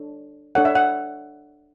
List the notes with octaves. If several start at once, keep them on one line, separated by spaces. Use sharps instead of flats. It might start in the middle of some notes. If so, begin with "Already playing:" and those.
Already playing: D4 A4 C#5
D4 A4 C#5 F#5
E5
F#5